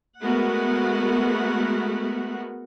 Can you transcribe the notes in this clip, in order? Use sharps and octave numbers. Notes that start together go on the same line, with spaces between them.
G#3 A3 B3 F#4 A#4 F#5